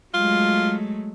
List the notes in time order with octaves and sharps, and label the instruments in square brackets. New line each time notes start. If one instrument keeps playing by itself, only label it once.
[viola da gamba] F#3 G#3 A3 [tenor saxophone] F4